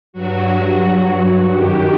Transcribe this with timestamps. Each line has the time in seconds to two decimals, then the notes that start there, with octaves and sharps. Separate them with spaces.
0.13 G2 F#3 F#4
1.52 F#2 D#3 F#3 G4